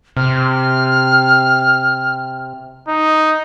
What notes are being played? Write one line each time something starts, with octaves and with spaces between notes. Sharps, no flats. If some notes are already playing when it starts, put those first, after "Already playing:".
C3 F6
D#4